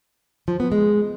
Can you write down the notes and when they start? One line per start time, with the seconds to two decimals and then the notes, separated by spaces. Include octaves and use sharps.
0.48 F3
0.60 B3
0.72 G#3